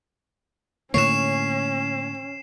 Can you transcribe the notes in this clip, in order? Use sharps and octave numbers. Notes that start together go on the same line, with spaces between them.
A2 D3 A#3 C#4 C#5 C7 E7